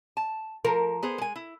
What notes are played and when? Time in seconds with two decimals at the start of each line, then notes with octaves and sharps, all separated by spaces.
0.17 A5
0.65 F3 A#4
1.03 B3 G#4 C5
1.18 G#3 G#5
1.36 E4